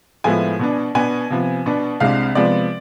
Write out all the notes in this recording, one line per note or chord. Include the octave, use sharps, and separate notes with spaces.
A2 F3 G#3 B3 E4 G#5
B2 B3 D4
B2 B3 D4 G#5
C3 F3 B3
B2 B3 D4
C2 C3 G#3 D4 F5
C3 F3 G#3 B3 D5